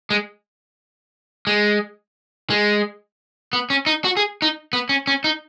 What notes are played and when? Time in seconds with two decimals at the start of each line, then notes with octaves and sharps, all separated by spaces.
0.10 G#3
1.47 G#3
2.50 G#3
3.53 B3
3.70 C#4
3.86 D#4
4.04 F#4
4.17 G#4
4.42 D#4
4.73 B3
4.89 C#4
5.07 C#4
5.24 D#4